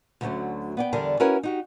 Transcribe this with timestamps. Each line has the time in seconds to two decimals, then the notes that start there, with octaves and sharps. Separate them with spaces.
0.21 D2 D3 F#3 G#3 A3 C#4
0.77 B3 D5 G5
0.92 E2 D3 G3 D4 A#4 G#5
1.20 C#4 E4 F#4 A#4 B4 C#5
1.43 D#4 F#4 G4